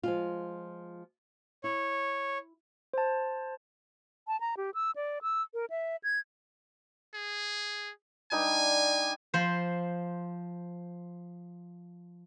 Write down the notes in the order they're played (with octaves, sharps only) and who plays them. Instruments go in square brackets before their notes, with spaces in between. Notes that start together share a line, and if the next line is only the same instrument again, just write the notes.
[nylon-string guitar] F3 G#3 F4
[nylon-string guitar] E4 [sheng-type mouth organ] C#5
[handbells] C5 A5
[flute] A5
A#5
G4
E6
D5
E6
A#4
E5
G#6
[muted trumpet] G#4
[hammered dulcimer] G3 D4 D#4 [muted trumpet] G#5
[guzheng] F3 C5